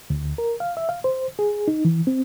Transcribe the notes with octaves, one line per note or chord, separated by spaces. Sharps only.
D2
A#4
F5
E5
F5
C5
G#4
D#4
E3
C4